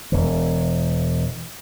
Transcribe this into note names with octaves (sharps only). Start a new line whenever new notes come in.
E1 E3